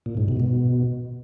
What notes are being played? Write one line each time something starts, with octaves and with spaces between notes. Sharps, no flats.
A#2
G#2
B2
B2